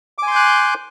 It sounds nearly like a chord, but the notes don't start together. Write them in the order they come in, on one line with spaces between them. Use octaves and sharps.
D6 G#5 C6 G6 F#6